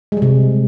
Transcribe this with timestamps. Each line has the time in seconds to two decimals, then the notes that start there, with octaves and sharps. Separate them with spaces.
0.12 G#3
0.17 G3
0.22 C3